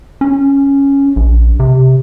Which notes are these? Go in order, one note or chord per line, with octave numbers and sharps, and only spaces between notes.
C#4
A#1
C3